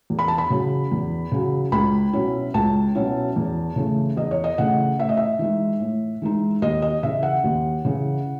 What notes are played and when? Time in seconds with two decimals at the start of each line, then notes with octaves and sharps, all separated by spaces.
0.10 E2
0.19 B5
0.28 A5
0.38 B5
0.50 C#3 F#3
0.92 E2
1.32 C#3 F#3
1.72 C#2 B5
2.13 B2 F#3 C#4 E4
2.54 C#2 A5
2.95 B2 F#3 C#4 E4
3.36 E2
3.76 C#3 E3 A3
4.17 E2 D#5
4.31 C#5
4.44 D#5
4.58 C#3 E3 A3 F#5
4.98 A2 E5
5.09 D#5
5.17 E5
5.39 E3 G#3 D#4
5.80 A2
6.22 E3 G#3 D#4
6.62 D#2 D#5
6.82 D#5
7.03 C#3 E3 E5
7.23 F#5
7.44 D#2
7.85 C#3 E3